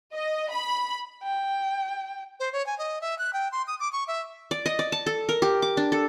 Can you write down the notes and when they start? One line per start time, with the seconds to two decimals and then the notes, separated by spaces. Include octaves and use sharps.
0.13 D#5
0.50 B5
1.24 G5
2.40 C5
2.53 C#5
2.66 G#5
2.78 D#5
3.01 E5
3.19 F#6
3.33 G5
3.52 C6
3.67 D#6
3.80 D6
3.92 C#6
4.08 E5
4.51 D5
4.66 D#5
4.79 D5
4.92 A5
5.06 A4
5.29 A#4
5.42 G4
5.62 D6
5.77 D4
5.92 A4